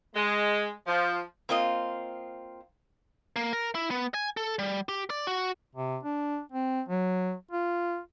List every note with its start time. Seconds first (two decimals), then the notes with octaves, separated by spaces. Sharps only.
0.15 G#3
0.87 F3
1.49 A#3 C4 F4 D#5
3.36 A#3
3.53 A#4
3.75 E4
3.91 B3
4.14 G#5
4.37 A4
4.59 G3
4.89 G4
5.10 D5
5.27 F#4
5.75 C3
6.03 D4
6.52 C4
6.88 F#3
7.51 F4